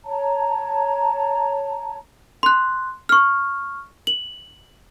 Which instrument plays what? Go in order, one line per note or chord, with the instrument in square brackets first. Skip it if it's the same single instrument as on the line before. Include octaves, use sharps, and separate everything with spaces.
[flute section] C#5 A5 A#5
[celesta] C6 F#6
C#6 F6
F#7